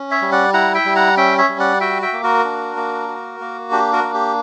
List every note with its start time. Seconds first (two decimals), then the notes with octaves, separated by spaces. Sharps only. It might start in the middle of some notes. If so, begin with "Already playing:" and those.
Already playing: C#4
0.11 C#5 E5
0.22 G3
0.32 D5 F#5
0.53 E4 F#5 A#5
0.74 E5 G5
0.85 G3
0.96 F#5 A#5
1.17 C#4 E5 G5
1.38 C#5 E5
1.49 G3
1.59 D5 F#5
1.81 F#4 E5 G5
2.02 E5 G5
2.13 A#3
2.23 F#4 A#4
2.44 D4
2.76 A#3
3.08 F#4
3.40 A#3
3.72 D4 G4
3.93 F#4 A#4
4.03 A#3
4.14 G4